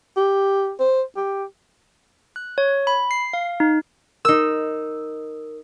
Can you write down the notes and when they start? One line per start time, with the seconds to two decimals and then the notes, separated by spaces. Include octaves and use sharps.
0.17 G4
0.80 C5
1.17 G4
2.36 F#6
2.58 C#5
2.87 B5
3.11 C7
3.33 F5
3.60 D#4
4.25 D#4 A#4 E6